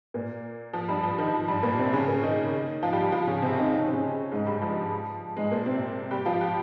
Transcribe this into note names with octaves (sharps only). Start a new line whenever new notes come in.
A#2 A#3
F3
G2 G3
F3
D#3
F3
G2 G3
A#2 A#3
C3 C4
C#3 C#4
A#2 A#3
D#3 D#4
F3 F4
G3 G4
G3 G4
F3 F4
C#3 C#4
C3 C4
D#3 D#4
D#4
C#4
C4
C#3 C#4
G#2 G#3
G2 G3
F3
G#2 G#3
A#2 A#3
C3 C4
G3 G4
F3 F4
G4